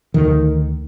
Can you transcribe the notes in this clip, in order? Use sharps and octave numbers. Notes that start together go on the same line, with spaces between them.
D2 D3 D#3